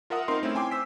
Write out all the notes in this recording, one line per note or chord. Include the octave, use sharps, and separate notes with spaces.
F4 A#4 E5 F#5 D#6
C4 D#4 A#4 C6
A3 C4 C#4 E4
G5 G#5 C6 D6
C5 E6 B6